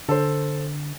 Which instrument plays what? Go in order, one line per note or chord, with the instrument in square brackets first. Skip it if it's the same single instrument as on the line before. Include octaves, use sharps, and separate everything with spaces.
[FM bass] D3 [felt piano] A4 C5